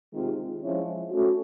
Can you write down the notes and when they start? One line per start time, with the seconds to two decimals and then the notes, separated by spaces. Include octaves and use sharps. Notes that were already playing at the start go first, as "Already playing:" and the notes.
0.13 C3 D#3 G#3 C4 F4
0.62 F3 G#3 C#4 E4
1.10 A3 C#4 F#4